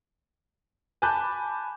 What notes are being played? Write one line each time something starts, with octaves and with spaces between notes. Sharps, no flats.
G#5 A5 B5 D6 F#6 G6